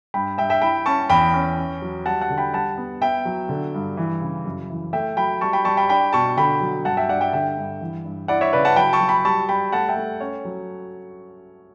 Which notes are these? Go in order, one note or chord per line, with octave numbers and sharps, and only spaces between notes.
G2 G5 B5
G2 E5 G5
E5 G5
E4 G5 B5
C#4 A5 C#6
E2 G5 B5
C#4
C#4
F#3
G3 F#5 A5
F#5 A5
D3
G5 B5
G3 F#5 A5
B3
B3 E5 G5
F#3
D3
G2
E3
C#3
F#2
E3
A3 E5 G5
F#3 G5 B5
G3 A5 C#6
G5 B5
G3 A5 C#6
G5 B5
D4 G5 B5
B2 A5 C#6
D3 G5 B5
F#3
G2 F#5 A5
E5 G5
G2 D5 F#5
E5 G5
D3 E5 G5
G2
E3
G2
E4 D5 F#5
C#5 E5
C#3 B4 D5
F#5 A5
F#3 G5 B5
A5 C#6
F#3
G5 B5
G3 A5 C#6
G3 G5 B5
A3 F#5 A5
E5 G5
A3
C#4 C#5
F#3